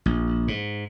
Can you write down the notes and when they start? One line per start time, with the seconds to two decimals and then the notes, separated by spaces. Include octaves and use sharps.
0.06 A#1
0.48 G#2